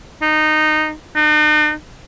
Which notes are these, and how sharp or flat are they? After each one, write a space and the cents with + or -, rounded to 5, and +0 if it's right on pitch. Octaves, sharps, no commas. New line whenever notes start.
D#4 -15
D#4 -45